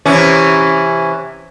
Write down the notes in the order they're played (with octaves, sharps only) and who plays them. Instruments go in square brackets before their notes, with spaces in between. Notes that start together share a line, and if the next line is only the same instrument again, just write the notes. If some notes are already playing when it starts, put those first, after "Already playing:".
[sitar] C3 E3 C#4